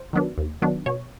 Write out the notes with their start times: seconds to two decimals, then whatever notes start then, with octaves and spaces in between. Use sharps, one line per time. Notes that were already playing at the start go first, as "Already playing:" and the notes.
Already playing: C5
0.13 D#3 F#3 B3 D4
0.38 D#2
0.62 D#3 F#3 B3 D4
0.86 B2 C#5